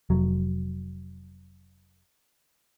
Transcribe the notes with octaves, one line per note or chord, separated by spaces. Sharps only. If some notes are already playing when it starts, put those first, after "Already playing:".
F1 F#3